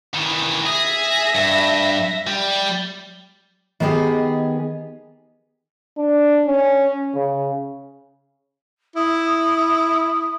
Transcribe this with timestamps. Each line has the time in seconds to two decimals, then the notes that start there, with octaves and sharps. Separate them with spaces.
0.14 D#3 E3
0.66 G#4 E5 A#6
1.35 G2
2.27 G3
3.80 D#3 B3 G4 G#4 D#5
5.98 D4
6.47 C#4
7.14 C#3
8.96 E4 D#6